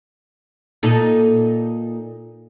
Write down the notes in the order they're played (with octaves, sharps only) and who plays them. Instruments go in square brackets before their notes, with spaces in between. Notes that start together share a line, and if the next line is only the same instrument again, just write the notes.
[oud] A#2 D#4 A4